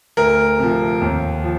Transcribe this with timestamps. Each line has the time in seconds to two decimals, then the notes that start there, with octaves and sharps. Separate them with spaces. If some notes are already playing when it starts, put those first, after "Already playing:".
0.17 D2 A#4
0.59 C3 F3
1.01 D#2
1.43 F3